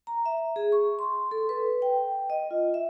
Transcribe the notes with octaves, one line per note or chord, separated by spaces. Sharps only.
A#5
E5
G#4
C#6
C6
A4
B4
G5
D#5
F4
E5